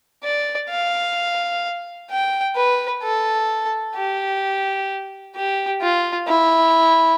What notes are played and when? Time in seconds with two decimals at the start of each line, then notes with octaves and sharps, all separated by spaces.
0.24 D5
0.70 F5
2.10 G5
2.56 B4
3.02 A4
3.96 G4
5.36 G4
5.82 F4
6.28 E4